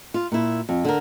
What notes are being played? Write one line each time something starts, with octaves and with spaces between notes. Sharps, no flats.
F4
A#2 E4
F2
D3 A#4